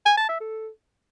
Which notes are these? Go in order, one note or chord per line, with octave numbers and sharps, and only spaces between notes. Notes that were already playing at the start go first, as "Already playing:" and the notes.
G#5
A5
E5
A4